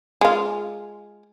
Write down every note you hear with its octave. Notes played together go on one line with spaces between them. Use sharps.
G#3 F4